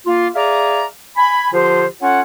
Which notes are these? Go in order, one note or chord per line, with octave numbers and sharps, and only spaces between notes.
A#3 F4
G#4 D5 E5 F5 A#5
G#5 B5
D3 F3 F4 G4 C5
C#4 F4 A4 C#5 F#5